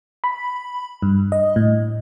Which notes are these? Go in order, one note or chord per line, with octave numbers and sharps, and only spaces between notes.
B5
G2
D#5
A2